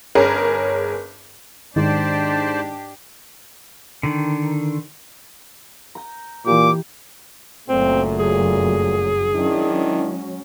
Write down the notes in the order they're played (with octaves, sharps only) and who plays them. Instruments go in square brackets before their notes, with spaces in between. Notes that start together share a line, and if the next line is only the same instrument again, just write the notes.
[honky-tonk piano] G1 C#4 G#4 A#4
[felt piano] G#2 [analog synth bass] D#3 [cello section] D4 G4 [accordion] C5 D5 A5
[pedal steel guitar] D3 D#3
[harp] A#5 G6
[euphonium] A#2 [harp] E3 G4 [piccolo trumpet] D6
[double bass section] F#1 F#2 F#3 [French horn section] A#2 A3 [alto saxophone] C4
[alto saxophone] G#4
[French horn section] D#3 D4 E4 [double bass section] F#3 G#3 C#4